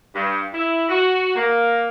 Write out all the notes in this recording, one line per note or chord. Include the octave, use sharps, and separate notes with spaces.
G2
E4
F#4
A#3